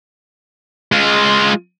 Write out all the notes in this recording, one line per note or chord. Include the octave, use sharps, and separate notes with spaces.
G#3 F4